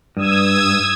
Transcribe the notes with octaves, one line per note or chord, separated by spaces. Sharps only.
G2 D#6 E6 G#6